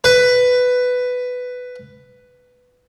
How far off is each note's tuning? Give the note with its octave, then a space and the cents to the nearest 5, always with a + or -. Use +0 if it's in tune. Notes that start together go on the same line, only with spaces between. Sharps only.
B4 +10